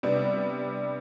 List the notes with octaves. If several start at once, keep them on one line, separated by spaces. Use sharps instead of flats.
C3 G3 B3 D4